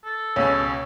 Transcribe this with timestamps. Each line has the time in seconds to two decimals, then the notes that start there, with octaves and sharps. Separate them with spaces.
0.04 A4
0.36 C#2 B2 C#4 C#5